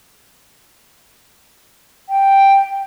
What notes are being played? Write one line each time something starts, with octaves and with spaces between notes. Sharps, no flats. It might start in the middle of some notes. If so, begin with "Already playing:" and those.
G5